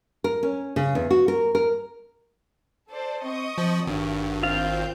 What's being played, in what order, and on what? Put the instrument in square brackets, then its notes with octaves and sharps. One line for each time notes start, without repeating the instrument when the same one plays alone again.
[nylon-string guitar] A#4
C#4
C#3
E2
F#4
A#4
A#4
[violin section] A4 C5 D5
[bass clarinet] C4 [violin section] D#5 C#6 D#6
[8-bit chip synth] F3 [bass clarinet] C4
[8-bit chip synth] G#1 [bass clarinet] G2 [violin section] F#4 G4
[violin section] C4 C5 G6 [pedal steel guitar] F4 F5